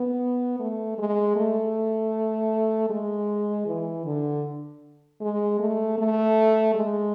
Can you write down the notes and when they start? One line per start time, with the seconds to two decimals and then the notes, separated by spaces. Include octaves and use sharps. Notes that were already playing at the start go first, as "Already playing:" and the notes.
Already playing: B3
0.60 A3
0.98 G#3
1.36 A3
2.90 G#3
3.66 E3
4.06 D3
5.21 G#3
5.60 A3
5.98 A3
6.74 G#3